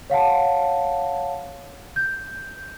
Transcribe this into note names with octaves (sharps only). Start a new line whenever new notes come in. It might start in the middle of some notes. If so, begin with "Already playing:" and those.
C#5 F5 F#5 A5
G6